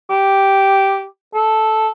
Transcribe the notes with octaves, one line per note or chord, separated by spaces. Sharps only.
G4
A4